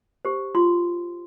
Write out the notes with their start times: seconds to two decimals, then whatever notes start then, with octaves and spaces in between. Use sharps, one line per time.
0.25 G4 C5
0.55 F4 C6